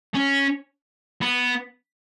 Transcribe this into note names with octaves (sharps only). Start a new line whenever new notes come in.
C#4
B3